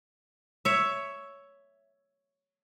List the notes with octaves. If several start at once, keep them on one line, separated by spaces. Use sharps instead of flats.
C#5 E5